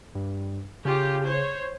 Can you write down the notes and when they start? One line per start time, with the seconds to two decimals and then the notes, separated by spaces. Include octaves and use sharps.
0.15 G2
0.85 C#3 F4 G4
1.26 C5 C#5